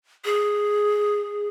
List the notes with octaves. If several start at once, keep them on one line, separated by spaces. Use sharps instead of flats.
G#4